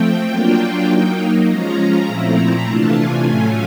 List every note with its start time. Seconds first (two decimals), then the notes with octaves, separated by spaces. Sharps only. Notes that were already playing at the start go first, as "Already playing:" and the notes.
Already playing: F3 A3 C4 G5
0.28 F#3 A#3 D4 F4
0.88 F#3 A#3 D#4 G5
1.47 F3 G#3 C#4 F4 A#5
2.07 A#2 F3 A3 C4 E4
2.66 C3 E3 A3 D4 F4 A5
2.97 G#5
3.26 A2 F#3 A3 C#4 F4 G#5